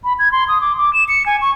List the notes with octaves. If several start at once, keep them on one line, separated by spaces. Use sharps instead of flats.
B5
G#6
C6
D#6
D6
D6
E7
C#7
G#5
C#6